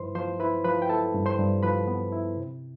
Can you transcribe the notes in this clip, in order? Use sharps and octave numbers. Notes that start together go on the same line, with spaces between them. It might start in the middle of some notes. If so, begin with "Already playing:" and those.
Already playing: G2 F3 E4 B4 C5 C6
F3 C5 C6
E4 B4 B5
F3 B4 B5
G5
E4 A4 A5
G2
C5 C6
G2
F3 B4 B5
B3
E4
C3